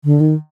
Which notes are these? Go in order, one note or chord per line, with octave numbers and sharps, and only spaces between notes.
D3
D#3